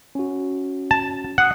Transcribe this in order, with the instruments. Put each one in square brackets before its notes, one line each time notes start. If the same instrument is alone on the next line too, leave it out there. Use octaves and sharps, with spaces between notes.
[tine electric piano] C#4 F#4
[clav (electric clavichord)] A5
[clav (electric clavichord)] F#5 [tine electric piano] D#6 C7